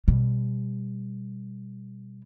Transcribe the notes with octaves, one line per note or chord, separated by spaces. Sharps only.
B2 G3